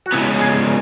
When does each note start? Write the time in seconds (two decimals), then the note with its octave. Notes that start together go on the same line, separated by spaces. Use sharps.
0.06 F#4
0.12 C#3 G#3 B3 E4
0.40 G#4
0.65 A#4